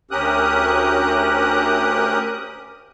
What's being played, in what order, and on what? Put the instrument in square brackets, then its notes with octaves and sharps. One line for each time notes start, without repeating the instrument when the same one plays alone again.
[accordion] D2 C#4 G4 A#4 D#6 F#6